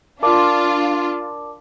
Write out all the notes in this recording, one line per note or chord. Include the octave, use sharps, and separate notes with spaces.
D4 F4 A#4 D5 A5 D6